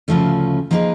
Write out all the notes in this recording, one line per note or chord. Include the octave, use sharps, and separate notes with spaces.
D2 C#3 F3 A3 C#4
F3 A#3 D#4 G#4 B4